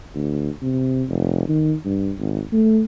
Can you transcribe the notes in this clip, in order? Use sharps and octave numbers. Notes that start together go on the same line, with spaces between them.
D2
C3
F1
D#3
G2
G#1
A3